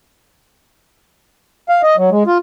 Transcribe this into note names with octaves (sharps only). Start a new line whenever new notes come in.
F5
D#5
F#3
G#3
F4